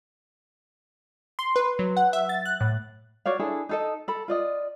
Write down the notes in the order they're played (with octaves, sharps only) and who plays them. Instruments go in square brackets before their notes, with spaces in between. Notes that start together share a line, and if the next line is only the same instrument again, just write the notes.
[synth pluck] C6
B4
F#3
F#5
E5
A6
F#6
A2
[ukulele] F#4 C#5 D5 F5
D4 E4 G#4 A4
D#4 A4 D#5
A4 B5
F4 D5 D#5